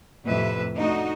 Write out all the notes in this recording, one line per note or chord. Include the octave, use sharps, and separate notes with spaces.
F2 A2 C3 B4 E5
A3 D4 D#4 F#4 D#5